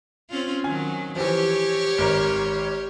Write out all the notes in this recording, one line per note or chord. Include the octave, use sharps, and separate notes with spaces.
C4 C#4 F4
D#3 F#3 G#5
E3 F3 G4 C#5
G#1 A#4